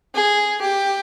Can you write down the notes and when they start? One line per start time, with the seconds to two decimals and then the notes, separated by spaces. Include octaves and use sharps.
0.15 G#4
0.62 G4